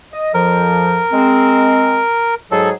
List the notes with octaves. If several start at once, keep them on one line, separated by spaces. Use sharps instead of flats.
D#5
F2 F3 A#4
G#3 C4
G#2 F#3 G#4 A4